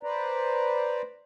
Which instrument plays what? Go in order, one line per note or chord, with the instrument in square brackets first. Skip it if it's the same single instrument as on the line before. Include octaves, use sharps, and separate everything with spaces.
[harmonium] B4 C5 D5 A#5